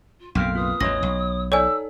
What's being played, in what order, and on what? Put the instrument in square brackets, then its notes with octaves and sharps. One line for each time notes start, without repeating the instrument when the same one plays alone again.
[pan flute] F4
[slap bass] B1 F#2 A2 [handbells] A#3 C4 F6 [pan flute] G5
[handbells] F4 B4 [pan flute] D#6
[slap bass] A1 E2 [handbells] C#4 C#5 D#5 [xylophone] A#6
[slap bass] B1 [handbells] C#5
[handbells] D#4 A4 [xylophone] C#5 D5 G#5 [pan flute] E6